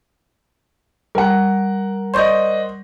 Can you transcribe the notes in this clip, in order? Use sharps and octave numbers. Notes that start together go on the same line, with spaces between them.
G3 A#4 F#5
C5 D5 D#5 C6 C#6 G6